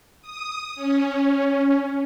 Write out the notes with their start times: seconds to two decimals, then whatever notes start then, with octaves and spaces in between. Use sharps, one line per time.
0.22 D#6
0.76 C#4